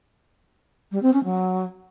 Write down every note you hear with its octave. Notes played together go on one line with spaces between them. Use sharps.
G3
C4
C#4
F#3